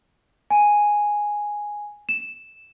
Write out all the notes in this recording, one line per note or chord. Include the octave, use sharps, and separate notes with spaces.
G#5
E7